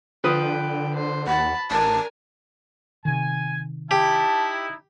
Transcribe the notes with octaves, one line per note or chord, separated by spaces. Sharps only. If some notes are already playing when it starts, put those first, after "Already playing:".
D3 F3 B4 G5 D#6
C5
D#2 F#5 A5 B5
A1 A#4 G#5 A5
C3 D#3 G#5
D#4 E4 G4 A5